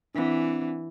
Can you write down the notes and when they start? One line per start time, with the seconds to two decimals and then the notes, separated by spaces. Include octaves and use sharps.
0.15 E3 C4 D4